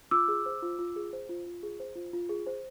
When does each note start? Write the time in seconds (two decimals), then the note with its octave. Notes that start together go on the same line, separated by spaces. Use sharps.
0.11 F4 D6 E6
0.28 G#4
0.46 C5
0.62 F4
0.79 F4
0.96 G#4
1.13 C5
1.29 F4
1.46 F4
1.63 G#4
1.80 C5
1.96 F4
2.13 F4
2.29 G#4
2.46 C5